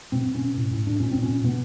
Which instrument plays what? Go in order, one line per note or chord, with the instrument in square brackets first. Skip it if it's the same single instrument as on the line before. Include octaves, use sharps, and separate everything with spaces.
[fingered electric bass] B2 C4
B2
C#4
B2
A2
A2
A2 D4
A#2 C#4
A#2 C4
C#4
A#2
B2 B3